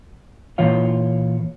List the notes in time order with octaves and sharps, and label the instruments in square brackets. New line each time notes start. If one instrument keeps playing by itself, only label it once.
[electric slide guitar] A#2 E3 F4 C#5 F5